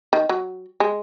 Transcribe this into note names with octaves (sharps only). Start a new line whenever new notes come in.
D#3
F#3
G#3